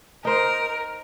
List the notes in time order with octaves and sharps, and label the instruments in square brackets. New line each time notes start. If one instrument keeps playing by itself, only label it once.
[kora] D#4 C5 [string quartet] A#4